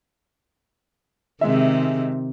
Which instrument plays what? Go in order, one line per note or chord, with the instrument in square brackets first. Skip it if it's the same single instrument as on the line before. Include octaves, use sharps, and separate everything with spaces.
[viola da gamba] C3 D#3 [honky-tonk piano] G#3 E5